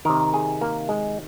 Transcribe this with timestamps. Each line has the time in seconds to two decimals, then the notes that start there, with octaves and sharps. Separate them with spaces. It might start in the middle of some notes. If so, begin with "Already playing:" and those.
0.05 C3 D#3 A#4
0.34 G#4
0.61 A#3
0.89 G#3